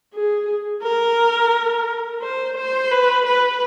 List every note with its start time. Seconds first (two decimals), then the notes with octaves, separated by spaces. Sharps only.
0.14 G#4
0.84 A#4
2.22 C5
2.57 C5
2.92 B4
3.26 B4